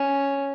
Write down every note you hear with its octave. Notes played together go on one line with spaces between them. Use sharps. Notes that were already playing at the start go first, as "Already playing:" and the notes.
Already playing: C#4